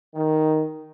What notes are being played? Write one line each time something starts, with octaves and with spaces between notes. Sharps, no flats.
D#3